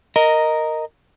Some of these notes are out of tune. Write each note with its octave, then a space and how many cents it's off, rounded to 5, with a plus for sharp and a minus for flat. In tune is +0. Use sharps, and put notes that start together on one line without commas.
A#4 -5 D#5 +0